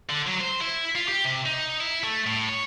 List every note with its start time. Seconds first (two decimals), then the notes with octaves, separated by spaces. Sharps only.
0.09 D3
0.27 F#3
0.40 C5
0.61 E4
0.96 F4
1.08 G4
1.25 C3
1.46 D#4
1.80 E4
2.04 A3
2.26 A2
2.49 C#5